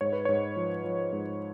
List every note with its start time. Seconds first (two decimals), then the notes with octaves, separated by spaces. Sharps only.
0.01 G#2 C#5
0.13 B4
0.25 G#2 C#5
0.56 F3
0.84 F3
1.13 G#2